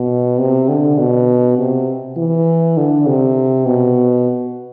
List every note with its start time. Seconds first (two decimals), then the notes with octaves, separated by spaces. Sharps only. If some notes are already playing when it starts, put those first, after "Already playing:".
Already playing: B2
0.39 C3
0.69 D3
0.98 B2
1.58 C3
2.17 E3
2.77 D3
3.07 C3
3.66 B2